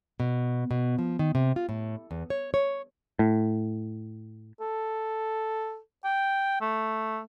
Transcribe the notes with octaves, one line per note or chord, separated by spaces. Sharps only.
B2
B2
F3
D#3
C3
F4
A2
E2
C#5
C#5
A2
A4
G5
A3